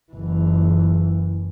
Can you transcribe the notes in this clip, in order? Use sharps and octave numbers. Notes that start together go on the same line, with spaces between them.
F#1 E3